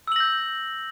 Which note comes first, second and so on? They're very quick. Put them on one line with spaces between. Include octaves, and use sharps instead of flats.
E6 F#7 A#6 G6